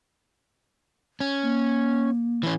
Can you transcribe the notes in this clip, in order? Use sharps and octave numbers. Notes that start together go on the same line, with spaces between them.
C#4
A#3
E3 C#4